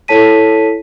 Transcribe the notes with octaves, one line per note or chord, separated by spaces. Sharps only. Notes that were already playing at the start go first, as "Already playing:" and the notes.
E4 A4 C#5 A5 B6 D#7